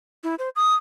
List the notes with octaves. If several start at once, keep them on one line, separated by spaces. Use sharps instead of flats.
E4
C5
D#6